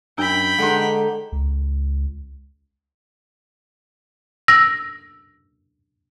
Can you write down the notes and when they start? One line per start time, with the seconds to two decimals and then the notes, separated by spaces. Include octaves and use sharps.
0.18 F#2 D4 G5 A#5 B5 E6
0.58 D3 G#3 D4 D#4 F#4 F#5
1.32 C#2
4.48 E6 A#6